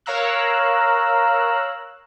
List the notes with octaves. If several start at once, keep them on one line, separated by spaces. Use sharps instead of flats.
A#4 C#5 F5 A#5 E6 F#6